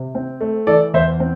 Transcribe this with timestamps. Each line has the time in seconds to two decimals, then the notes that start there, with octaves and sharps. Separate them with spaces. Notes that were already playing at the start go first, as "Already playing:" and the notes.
Already playing: C3
0.15 C4
0.41 A3
0.67 E3 A4 D5
0.94 E2 C5 E5
1.20 C4